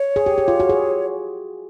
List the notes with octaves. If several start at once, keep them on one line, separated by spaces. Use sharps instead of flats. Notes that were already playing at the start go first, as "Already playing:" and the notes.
Already playing: C#5
G#4
G4
G4
F4
F#4
G#4